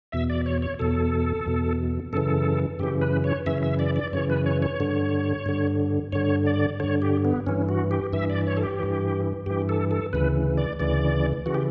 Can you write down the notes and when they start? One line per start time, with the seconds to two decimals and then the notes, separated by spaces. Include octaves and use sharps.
0.12 E2 B2 E5
0.30 D5
0.46 C#5
0.62 C#5
0.79 E2 B2 A4
1.46 E2 B2
2.13 F#2 C#3 E3 A4
2.79 F#2 C#3 E3 G4
3.01 B4
3.24 C#5
3.46 F#2 C#3 E3 E5
3.63 E5
3.79 D5
3.96 D5
4.13 F#2 C#3 E3 C#5
4.30 B4
4.46 C#5
4.62 C#5
4.80 G2 D3
5.46 G2 D3
6.12 G2 D3 C#5
6.46 D5
6.80 G2 D3 C#5
7.02 G4
7.25 B3
7.47 G2 E3 C#4
7.69 F#4
7.91 G4
8.13 G2 E3 E5
8.30 D5
8.47 C#5
8.57 A4
8.63 G4
8.79 G2 E3
9.46 G2 E3 G4
9.69 A4
9.91 A4
10.13 D2 C#3 E3 B4
10.57 D5
10.79 D2 C#3 E3 D5
11.46 C#3 E3 F#4
11.55 G4